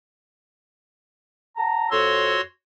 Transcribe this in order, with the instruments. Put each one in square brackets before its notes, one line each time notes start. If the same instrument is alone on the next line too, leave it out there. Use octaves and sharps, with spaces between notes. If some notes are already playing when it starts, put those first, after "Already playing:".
[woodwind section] F#5 A5 A#5
[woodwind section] F2 E6 [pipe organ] F#4 C#5 C6